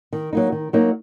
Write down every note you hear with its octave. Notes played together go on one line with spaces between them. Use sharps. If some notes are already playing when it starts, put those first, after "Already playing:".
D#3
F#3 A#3 D#4
D#3
F#3 A#3 D#4